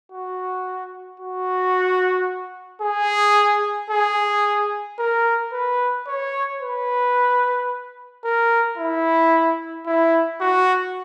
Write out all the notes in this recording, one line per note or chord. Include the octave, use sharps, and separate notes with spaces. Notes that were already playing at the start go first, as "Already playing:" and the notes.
F#4
F#4
G#4
G#4
A#4
B4
C#5
B4
A#4
E4
E4
F#4